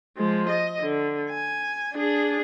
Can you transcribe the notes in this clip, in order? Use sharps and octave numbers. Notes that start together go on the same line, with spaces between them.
F3 G#3
D#5
D3
G#5
D4 G#4